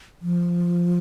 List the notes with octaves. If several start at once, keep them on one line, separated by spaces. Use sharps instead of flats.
F3